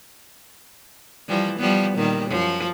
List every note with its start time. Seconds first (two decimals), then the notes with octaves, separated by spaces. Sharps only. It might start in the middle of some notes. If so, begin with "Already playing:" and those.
1.28 E3 F3 G3
1.59 F3 G3 B3
1.95 A#2 D#3 G3
2.28 F#2 F3